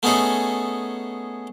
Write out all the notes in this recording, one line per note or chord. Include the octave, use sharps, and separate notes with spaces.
A3 B3 C#4 D#4 G#4 A4